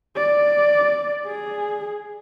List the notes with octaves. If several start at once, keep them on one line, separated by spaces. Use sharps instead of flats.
D5
G#4